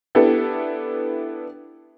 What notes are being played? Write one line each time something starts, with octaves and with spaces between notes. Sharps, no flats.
B3 D4 E4 G4 A4